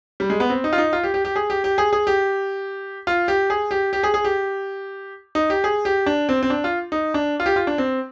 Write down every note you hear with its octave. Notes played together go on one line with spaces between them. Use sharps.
G3
G#3
B3
C4
D#4
F4
D#4
F4
G4
G4
G4
G#4
G4
G4
G#4
G#4
G4
F4
G4
G#4
G4
G4
G#4
G#4
G4
D#4
G4
G#4
G4
D4
C4
C4
D4
F4
D#4
D4
F4
G4
F4
D4
C4